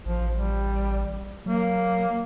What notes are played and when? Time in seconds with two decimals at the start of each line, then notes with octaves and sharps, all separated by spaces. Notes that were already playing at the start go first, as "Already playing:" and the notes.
0.05 A1 F3
0.37 G3
1.46 F#3 A#3